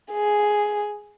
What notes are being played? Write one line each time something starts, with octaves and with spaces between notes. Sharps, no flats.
G#4